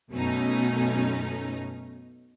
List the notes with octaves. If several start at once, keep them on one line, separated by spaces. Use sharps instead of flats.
F#2 B2 A3 C#4 D#4